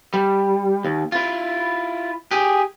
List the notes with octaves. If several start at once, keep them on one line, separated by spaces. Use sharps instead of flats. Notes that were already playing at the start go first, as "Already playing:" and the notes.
G3
D#2
E4 F4
G4 G#4